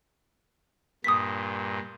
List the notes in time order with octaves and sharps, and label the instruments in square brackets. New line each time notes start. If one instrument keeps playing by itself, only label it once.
[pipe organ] G2 A#2 [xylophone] D#6 B6